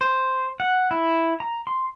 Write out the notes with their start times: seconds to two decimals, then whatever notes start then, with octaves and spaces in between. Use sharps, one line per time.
0.01 C5
0.60 F#5
0.91 E4
1.40 A#5
1.67 C6